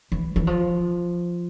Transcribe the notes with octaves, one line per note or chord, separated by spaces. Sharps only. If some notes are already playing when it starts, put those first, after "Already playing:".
E3
E3
F3